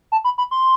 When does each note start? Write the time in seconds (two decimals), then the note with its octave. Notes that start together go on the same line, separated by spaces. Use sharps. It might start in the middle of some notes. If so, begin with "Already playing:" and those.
0.12 A5
0.24 B5
0.38 B5
0.51 C6